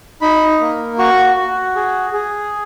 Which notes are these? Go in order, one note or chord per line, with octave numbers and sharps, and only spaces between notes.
D#4 B5
A#3
F#4 C#6
F#4
G#4
G#4